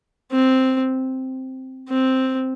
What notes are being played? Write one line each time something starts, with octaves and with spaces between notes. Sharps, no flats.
C4
C4